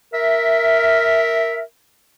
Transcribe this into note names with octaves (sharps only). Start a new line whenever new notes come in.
A#4 E5